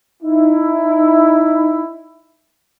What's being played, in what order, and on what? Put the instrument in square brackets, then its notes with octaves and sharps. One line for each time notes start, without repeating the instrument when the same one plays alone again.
[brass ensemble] D#4 E4